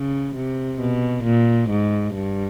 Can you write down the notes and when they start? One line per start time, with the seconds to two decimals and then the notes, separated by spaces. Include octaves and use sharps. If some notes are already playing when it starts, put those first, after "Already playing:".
Already playing: C#3
0.35 C3
0.81 B2
1.24 A#2
1.70 G#2
2.15 G2